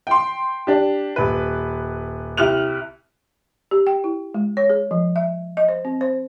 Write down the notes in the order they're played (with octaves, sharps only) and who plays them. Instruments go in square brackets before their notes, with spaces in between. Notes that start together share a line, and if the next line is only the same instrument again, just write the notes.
[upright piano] G5 C6
D4 G4
D#1 B4
C2 E4 G4 F6 F#6 F7
[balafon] G4
G5
E4
G#3
C#5
G#4
F3
E5
D#5
C5
C4
C5